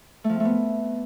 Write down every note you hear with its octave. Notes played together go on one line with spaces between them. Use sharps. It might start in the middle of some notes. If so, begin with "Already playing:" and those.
A3
F3
C4
A3
B3